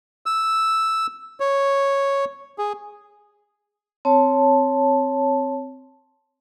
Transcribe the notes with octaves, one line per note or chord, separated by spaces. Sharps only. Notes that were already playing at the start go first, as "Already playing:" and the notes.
E6
C#5
G#4
C4 C#5 A5